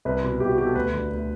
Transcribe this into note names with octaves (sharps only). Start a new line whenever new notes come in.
C2 B4
B2
C2 G4
F#4
B2 G4
A4
D2 B4
D3
D2